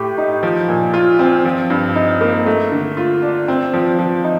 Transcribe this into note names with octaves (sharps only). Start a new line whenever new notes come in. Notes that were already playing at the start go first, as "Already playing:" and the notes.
Already playing: A2 A3 G4
D#4
F3
A#2
F4
C4
F3
G2
D#4
A#3
A3
D3
F4
D4
C4
F3
F3
D#4